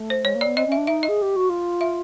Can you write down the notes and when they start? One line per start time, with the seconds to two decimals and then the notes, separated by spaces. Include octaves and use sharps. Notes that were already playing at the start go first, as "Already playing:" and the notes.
Already playing: A3
0.10 C5
0.25 G#3 C#5
0.35 A#3
0.41 B3 D5
0.57 C4 D#5
0.67 C#4 E5
0.77 D4
0.87 D#4 E5
1.03 D#5
1.09 G#4
1.22 G4
1.36 F#4
1.50 F4
1.81 E5